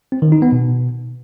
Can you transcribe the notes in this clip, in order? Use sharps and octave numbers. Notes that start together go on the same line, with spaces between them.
C4
D#3
D#4
B3
B2